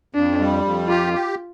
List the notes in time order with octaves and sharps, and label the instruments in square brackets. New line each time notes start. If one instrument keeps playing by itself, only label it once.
[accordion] F2 [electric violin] D4
[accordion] G3
F2
[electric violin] F4 [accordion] G4
[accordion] G4